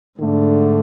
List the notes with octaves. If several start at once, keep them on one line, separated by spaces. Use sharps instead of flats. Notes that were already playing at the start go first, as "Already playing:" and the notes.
G#2 D3 A3 D4